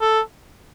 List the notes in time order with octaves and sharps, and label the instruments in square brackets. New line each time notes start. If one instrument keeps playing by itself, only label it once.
[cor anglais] A4